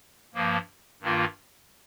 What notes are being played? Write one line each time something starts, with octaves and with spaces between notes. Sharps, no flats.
G2 F3 A#3
G2 D#3 A#3 F4